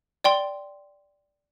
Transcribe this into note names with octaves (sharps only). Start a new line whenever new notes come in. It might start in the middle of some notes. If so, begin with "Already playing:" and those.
D5 G5 C6